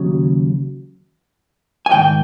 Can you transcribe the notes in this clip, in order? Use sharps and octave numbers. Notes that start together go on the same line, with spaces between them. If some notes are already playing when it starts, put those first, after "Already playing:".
Already playing: D#2 C#3 F#3
G#5
G#2 D#3 G5